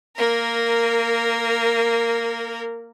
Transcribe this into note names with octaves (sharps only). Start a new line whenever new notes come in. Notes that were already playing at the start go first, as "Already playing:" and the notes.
A#3 A#4